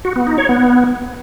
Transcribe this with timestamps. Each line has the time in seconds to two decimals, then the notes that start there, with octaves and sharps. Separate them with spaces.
0.05 F#4
0.16 B3
0.27 D#4
0.38 C#5
0.49 B3